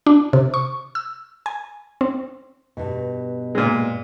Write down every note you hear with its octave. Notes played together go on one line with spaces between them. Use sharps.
D4
C3
C#6
E6
G#5
C4
G2 B2
A#2 G#3